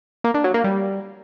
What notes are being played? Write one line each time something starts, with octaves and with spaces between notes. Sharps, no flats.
A#3
D4
F#3
A#3
G3